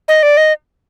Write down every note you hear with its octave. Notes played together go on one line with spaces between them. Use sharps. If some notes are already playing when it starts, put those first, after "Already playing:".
D#5
D5
D#5